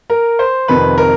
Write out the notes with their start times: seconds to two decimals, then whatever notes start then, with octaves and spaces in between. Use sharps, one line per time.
0.10 A#4
0.39 C5
0.68 F2 C3 D#3 B4
0.98 A#4